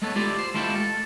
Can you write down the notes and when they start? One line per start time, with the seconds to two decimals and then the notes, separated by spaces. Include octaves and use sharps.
0.02 G#3 A3 B3 A4 C#5
0.16 E4 F4 G4 A4 D5
0.39 C5
0.54 G#3 A3 E4 F4 G4 A4
0.76 A4